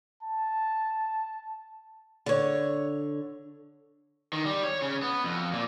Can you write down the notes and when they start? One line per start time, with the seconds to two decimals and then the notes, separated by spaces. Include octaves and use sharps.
0.23 A5
2.26 D3 C#5
4.33 D#3
4.45 G3
4.63 C#5
4.82 C#3
5.02 B3
5.24 F2
5.53 A#2